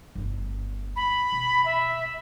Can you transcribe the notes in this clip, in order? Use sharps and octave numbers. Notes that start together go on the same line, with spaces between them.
G1 D2
B5
B2
E5